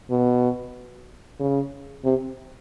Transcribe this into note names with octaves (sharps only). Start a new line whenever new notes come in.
B2
C#3
C3